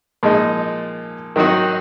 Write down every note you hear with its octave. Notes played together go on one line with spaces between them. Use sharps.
A#2 F3 G#3 D#4
D#3 F#3 C4 D#4 F#4